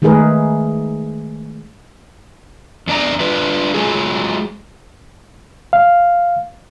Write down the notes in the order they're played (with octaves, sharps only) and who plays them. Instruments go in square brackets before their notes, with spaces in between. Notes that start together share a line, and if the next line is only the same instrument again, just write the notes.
[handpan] D#3 G#3 A3 G#4 A#4 B4
[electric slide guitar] E2 D4 D5 A#5
D4 F4 B4
F#3 G#3 F4 G#4
[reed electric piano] F5